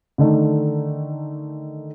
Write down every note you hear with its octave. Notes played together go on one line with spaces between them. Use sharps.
D3 D#3 A3 D#4